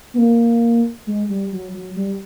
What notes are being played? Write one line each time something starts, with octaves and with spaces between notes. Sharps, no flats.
B3
A#3
G#3
G3
F#3
F#3
G3